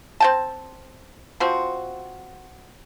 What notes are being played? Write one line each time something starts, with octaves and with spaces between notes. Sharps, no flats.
C4 G5 A5
F3 C4 F#4